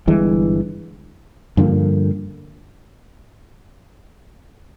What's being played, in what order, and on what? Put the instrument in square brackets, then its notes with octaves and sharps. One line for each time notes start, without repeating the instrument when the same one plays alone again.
[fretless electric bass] G1 G2 E3 G#3
G2 D3 F3 A#3